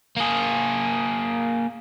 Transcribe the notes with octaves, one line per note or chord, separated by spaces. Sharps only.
A#3 G#4